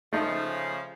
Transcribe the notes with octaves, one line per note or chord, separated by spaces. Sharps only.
C#3 F3 A3 D#4